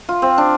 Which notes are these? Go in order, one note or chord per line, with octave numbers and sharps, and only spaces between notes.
F4
C4
D4